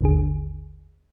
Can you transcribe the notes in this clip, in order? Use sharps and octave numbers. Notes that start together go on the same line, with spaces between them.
G#1 D#2 D3 G#4